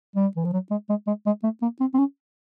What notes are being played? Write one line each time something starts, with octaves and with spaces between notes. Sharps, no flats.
G3
E3
F3
F#3
G#3
G#3
G#3
G#3
A3
A#3
C4
C4
C#4